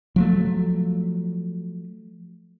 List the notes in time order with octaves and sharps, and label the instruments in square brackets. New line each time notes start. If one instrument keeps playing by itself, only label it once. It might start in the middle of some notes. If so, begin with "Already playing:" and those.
[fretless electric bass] F3 F#3 A3